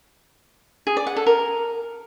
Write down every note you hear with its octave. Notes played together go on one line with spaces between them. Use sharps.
G#4
D5
F#5
A4
A#4